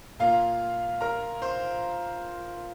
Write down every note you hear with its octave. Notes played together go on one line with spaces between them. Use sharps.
A#2 A#3 F4 F5
A#4 A#5
C5 C6